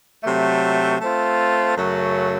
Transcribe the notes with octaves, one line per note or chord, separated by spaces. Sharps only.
C3 F#3 A3
A3 C4 F4
F#2 C#3 F#3 A3